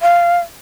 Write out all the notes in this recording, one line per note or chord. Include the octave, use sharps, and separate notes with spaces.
F5